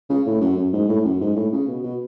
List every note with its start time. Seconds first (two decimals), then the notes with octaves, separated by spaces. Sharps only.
0.10 C#3
0.26 A2
0.41 F#2
0.56 F#2
0.73 G#2
0.88 A2
1.05 F#2
1.21 G#2
1.35 A2
1.52 C#3
1.67 B2
1.83 B2